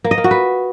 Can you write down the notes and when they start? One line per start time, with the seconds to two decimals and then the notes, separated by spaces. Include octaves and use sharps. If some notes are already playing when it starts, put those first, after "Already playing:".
0.04 A#3
0.11 D#5
0.18 A#3
0.24 F#4
0.31 B4